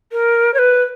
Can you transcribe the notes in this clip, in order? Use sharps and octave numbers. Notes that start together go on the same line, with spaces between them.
A#4
C#5
B4